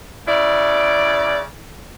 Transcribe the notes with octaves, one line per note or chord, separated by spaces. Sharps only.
C#3 E4 D5